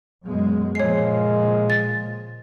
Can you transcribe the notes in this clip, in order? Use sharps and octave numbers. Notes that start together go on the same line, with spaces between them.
F#2 B2 G#3
A#2 C#3 F3 G#3 C#5 C7
A6